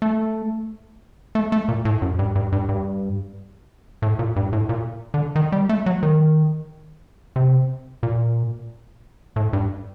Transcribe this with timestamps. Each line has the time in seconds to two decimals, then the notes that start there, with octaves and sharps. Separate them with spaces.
0.02 A3
1.35 A3
1.52 A3
1.68 A#2
1.85 A2
2.02 F#2
2.19 G2
2.36 G2
2.52 G2
2.69 G2
4.02 A2
4.19 A#2
4.36 G2
4.53 A2
4.69 A#2
5.14 D3
5.36 D#3
5.52 G3
5.69 A3
5.86 F#3
6.03 D#3
7.36 C3
8.03 A#2
9.36 A2
9.53 G2